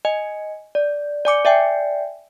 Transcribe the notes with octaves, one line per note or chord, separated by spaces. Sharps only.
D#5 G#5
D5
D5 G#5 D6 C#7
D5 E5 G5 G#5